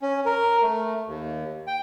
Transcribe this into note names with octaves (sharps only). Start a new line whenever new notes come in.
C#4
A#4
A3
D#2
G5